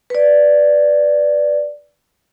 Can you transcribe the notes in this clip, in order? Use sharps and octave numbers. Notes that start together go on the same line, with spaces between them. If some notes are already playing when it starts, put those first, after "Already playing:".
B4 D5